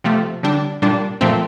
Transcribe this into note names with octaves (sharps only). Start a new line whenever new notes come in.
C3 F3 A3
D3 G3 D4
A#2 G3 D4
A#2 F3 A3 C4